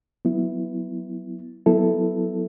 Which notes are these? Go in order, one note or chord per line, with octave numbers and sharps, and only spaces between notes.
F#3 B3 E4
F#3 B3 E4 A4